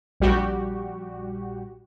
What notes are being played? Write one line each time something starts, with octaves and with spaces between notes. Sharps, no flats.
A#1 G3 F#4 G4